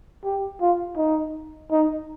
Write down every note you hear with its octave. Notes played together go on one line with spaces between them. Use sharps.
G4
F4
D#4
D#4